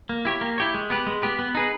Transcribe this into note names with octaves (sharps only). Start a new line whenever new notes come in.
A#3
E4 G4 C#5
A#3
E4 G4 C#5
G#3
B3 G4 B4
G#3
B3 G4 B4
B3
D#4 G#4 B4